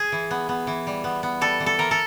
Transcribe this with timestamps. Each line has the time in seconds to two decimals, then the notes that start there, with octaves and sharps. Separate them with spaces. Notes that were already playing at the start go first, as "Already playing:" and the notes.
Already playing: G#4
0.12 E3
0.31 B3
0.49 B3
0.67 E3
0.87 G3
1.04 B3
1.23 B3
1.41 G3 A4
1.60 E3
1.66 A4
1.78 E3 A#4
1.91 A4